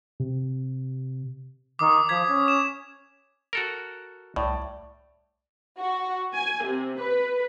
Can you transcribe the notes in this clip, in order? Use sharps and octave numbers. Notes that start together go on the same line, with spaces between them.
C3
D#3 D6 D#6
F3 G#6 B6
C#4
E7
F#4 A4 A#4
C2 A2 D5
F#4
G#5
C3
B4